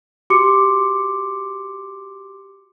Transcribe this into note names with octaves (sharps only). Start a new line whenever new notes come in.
F#4 G4 C6 D6 C#7